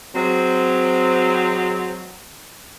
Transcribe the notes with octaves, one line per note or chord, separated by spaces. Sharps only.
F#3 G#3 C4